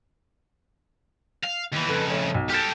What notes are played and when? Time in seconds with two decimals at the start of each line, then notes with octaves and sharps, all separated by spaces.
1.44 F5
1.73 D#2 E3
1.89 F2 C#3 A4 B4
2.10 A3 C#5
2.34 B1
2.50 G4 A4 F6 G6 A6